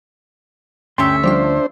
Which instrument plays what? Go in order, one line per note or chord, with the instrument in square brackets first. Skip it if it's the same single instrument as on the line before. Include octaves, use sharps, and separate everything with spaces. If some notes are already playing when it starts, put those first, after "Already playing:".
[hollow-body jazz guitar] D2 C#4 C6 [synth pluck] G2 [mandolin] A4 C#5 E5 [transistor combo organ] G5
[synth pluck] F3 G3 F4 [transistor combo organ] D4 C5